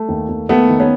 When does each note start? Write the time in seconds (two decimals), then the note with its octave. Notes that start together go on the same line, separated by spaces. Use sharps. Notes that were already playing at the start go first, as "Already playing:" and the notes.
Already playing: A3
0.09 D#2
0.29 D#2
0.49 D#2 A3 B3
0.70 D#3
0.80 B3 C#4